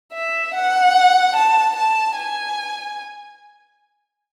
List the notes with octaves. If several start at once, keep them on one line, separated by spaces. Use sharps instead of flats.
E5
F#5
A5
A5
G#5